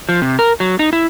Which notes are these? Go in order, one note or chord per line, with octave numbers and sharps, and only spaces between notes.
F3
C3
A#4
F#3
D#4
E4